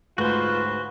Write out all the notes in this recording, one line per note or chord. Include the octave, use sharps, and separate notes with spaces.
D2 G#2 F4 F#4 B4 C5 F#6